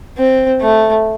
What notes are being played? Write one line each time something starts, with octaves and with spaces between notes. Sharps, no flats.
C4
A3